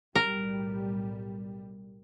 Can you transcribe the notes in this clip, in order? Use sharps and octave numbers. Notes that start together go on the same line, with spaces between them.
B1 A2 G3 A#4